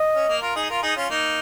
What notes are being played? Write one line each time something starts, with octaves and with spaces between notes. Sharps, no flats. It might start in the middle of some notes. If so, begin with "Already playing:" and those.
Already playing: D#5
C#4
A#3
F4 A#4
D#4 G#4
F4 A#4
D#4 G#4
C#4 F4
A#3 D#4